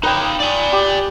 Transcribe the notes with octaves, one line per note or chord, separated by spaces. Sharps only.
D#4 B4 C#5 D#5 G5
D5 G#5
G4